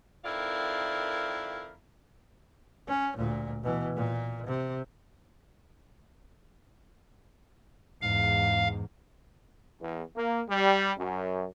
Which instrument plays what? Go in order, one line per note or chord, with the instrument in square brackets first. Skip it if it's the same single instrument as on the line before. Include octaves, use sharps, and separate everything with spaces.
[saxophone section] F2 D#3 E4 A#4 D5 F5
[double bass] C#4
D2 A#2
B2 E3
A#2
C3
[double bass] E2 G#2 [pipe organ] F5
[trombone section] E2
A#3
G3
F#2